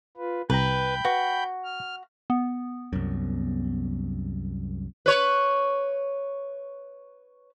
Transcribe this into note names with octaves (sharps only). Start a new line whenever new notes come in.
F4 B4
C2 B4 G5 A#5 B5 G6
F#4 B4
F6
B3
C2 F#2
B4 C#5